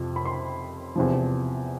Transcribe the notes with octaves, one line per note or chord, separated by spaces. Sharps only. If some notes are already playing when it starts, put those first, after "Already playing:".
Already playing: F2 C3 F3
B5
C6
E2 C3 F3